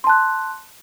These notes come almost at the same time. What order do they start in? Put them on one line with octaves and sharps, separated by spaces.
C6 A5 F#6